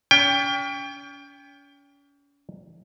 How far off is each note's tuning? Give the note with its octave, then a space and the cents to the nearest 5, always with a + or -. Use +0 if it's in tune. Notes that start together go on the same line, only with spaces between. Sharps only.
C#4 +40 G5 +20